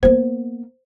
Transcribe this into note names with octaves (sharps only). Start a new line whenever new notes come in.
A#3 B3 C5